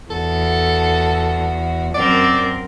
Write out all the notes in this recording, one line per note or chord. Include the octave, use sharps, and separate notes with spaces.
E2 F#4 A4
F#2 C4 A#4 D5